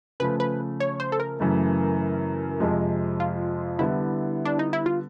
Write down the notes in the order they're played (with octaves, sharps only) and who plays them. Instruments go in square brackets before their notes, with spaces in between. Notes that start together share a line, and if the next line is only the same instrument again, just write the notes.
[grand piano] C#3 F3 A3 [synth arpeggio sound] B4
[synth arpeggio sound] B4
C#5
C5
A4
A#4
[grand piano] F#2 C#3 E3 A3
F2 C3 F3 G#3
[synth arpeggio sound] F4
[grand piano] D3 G3 B3 [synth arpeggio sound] E4
[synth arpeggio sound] D4
D#4
E4
F4